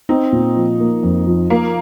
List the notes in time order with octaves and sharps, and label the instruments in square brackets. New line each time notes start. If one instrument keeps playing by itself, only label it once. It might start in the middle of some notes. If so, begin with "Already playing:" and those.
[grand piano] C4 [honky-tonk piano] D#4
[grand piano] A#2
F3
A#3
F2
F3
[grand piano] F3 [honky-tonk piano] A#3